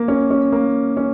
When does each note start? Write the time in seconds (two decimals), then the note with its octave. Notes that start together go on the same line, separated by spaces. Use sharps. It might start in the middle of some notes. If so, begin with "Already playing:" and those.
Already playing: A#3
0.08 C#4
0.31 C#4
0.52 A#3
0.97 C#4